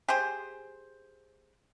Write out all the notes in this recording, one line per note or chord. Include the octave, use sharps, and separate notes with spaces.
G4 G#4 C5